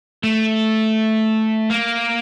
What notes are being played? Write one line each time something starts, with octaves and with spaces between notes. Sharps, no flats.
A3
A#3